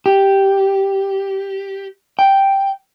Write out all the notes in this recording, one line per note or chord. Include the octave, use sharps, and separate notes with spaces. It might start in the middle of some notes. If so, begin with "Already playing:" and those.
G4
G5